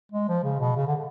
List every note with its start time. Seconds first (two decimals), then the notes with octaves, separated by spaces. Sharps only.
0.12 G#3
0.29 F3
0.44 C#3
0.60 B2
0.76 C#3
0.87 D3